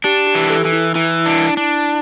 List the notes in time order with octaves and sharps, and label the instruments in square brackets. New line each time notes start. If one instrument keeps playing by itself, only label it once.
[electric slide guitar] D4 [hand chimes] G4
[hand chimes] G4
[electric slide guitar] E3
[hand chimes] A4
[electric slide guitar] E3
[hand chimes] E4
[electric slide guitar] E3 [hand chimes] E4
[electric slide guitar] D4
D4